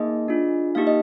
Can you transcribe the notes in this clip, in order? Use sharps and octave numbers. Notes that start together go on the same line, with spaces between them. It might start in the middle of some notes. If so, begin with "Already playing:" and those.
Already playing: A#3 D#4 G#4 D#5
D4 F4 G#4
A#3 D#4 G4 F5
D#5